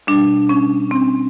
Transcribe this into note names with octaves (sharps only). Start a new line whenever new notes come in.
B2 G3 D4
C#4
C4